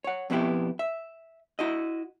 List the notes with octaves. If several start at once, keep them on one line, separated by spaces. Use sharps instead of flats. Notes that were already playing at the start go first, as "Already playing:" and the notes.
C#5 F#5
F2 B2 B3 D4 E4 G4
E5
E4 F#4 D#5